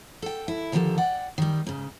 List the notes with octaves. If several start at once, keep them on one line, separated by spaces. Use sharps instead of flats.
A4 G5
E4
D3 D#3 F3 F4 G4 A4
D5 F#5 G5
D#3 G3
G#2 C#3